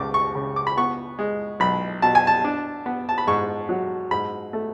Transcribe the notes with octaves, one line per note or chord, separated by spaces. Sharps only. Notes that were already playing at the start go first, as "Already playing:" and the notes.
Already playing: C#2 D6
C#6
C#3
D6
B5
B3 C#6
G#3
B1 B5
B2 A5
G#5
A5
D4
B3
A5
B5
G#2 C#6
F#3
G#2 B5
A3